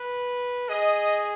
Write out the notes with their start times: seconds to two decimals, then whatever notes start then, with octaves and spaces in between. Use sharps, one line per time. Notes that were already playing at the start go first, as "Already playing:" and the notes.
Already playing: B4
0.69 G#4 D#5